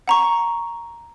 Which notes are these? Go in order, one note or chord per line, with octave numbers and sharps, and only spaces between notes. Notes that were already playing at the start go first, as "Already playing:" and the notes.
F#5 A#5 C#6